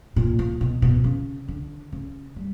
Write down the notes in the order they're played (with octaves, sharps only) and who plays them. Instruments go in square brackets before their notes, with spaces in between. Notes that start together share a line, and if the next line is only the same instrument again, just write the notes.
[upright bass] A#2
A#2
B2
B2
C#3
D3
C#3
G3